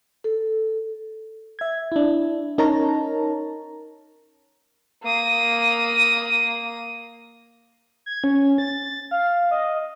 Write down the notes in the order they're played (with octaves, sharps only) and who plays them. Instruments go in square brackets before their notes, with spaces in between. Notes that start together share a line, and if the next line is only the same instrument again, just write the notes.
[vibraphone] A4
[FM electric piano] E5 G#6
D4 E4
C#4 D#4 A#4 C#5 A5 A#5
[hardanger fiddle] A#3 D#6
[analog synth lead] G#6
C#4
A6
F5
D#5